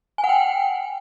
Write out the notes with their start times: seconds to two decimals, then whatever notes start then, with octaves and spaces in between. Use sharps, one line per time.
0.18 G#5
0.24 F#5
0.29 G5